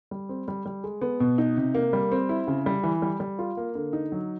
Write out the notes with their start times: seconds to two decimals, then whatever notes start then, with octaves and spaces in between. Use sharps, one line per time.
0.11 G3
0.29 C4
0.48 G3
0.66 G3
0.84 G#3
1.01 B3
1.20 B2
1.38 D#4
1.57 C3
1.74 A#3
1.93 G3
2.12 C4
2.29 E4
2.47 C#3
2.66 G3
2.83 E3
3.02 G3
3.20 G3
3.39 F4
3.57 A#3
3.75 D3
3.93 D#4
4.12 F#3